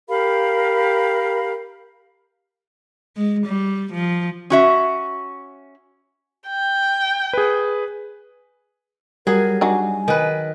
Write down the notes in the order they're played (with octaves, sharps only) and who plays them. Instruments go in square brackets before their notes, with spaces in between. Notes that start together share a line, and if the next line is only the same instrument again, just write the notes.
[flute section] G4 A#4 F5 B5
[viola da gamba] G#3
G3
F3
[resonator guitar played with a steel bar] C#4 F#4 E5
[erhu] G5
[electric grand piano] G#4 B4
[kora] F#3 G#4 [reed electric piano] G3 [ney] A#4
[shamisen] D4 D#4 F#4 [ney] G#5
[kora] D#3 B4